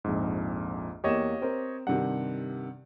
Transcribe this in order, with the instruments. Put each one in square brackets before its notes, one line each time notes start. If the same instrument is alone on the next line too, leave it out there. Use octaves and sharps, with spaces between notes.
[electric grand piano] A#1 F2 G#2
[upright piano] E2 A#3 E7 [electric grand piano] G4 C#5 D#5
[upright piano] C4 A#4 C5
[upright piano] G2 C3 D#3 [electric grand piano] F#5